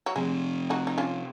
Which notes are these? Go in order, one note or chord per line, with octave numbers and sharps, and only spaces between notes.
F#3
C3 F3 G#3 C4
D#4 F#4
D#4
C#4 F4